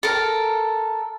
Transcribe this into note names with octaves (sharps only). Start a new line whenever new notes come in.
A4 A#4